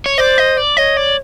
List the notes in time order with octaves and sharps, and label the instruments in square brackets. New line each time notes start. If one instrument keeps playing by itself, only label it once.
[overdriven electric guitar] C#5
[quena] C5 [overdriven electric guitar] D5
[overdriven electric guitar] D#5
D5
[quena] C#5 [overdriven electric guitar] D#5
[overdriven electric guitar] D5